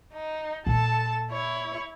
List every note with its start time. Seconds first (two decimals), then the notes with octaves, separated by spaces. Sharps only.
0.14 D#4
0.66 A#2 A4 A5
1.31 E4 C#5